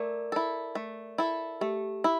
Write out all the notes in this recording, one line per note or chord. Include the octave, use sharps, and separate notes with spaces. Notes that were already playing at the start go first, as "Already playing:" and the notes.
Already playing: A3 A#4 D5
E4 A4
A3
E4 A4
A3 G4
E4